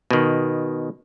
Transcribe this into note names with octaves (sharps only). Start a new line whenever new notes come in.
B2 D#3